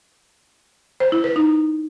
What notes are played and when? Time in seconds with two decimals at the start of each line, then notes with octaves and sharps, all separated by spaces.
1.00 C5
1.12 E4
1.24 B4
1.36 D#4